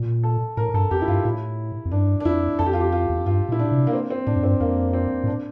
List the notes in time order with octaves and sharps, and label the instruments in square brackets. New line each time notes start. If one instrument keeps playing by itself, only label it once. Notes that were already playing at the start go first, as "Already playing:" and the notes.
Already playing: [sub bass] A#2
[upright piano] A4
[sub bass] A2 [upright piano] A#4
[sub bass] G2 [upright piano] A4
[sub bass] F2 [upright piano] G4
[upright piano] E4
[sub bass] G2 [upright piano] F4
[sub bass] A2 [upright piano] E4
[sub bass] F2
[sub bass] G2 [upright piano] D4
[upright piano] D4
[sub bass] F2 [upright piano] E4
[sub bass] F2 [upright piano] A4
[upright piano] G4
F4
G4
F4
[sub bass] E2
F2
[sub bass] G2 [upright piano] F4
[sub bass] A#2 [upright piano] E4
[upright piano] D4
[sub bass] C3
[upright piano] A#3
C4
C4
[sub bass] A2 [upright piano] D4
[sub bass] F2
[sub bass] G2 [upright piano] C4
[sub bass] F2 [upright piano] A#3
[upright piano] C4
[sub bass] A2
[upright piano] D4